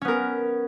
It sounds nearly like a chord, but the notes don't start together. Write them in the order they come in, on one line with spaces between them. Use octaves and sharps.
C#4 B3 A#4